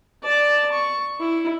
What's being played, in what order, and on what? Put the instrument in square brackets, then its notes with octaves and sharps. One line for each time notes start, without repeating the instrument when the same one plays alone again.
[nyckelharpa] D5 A5
C#6
E4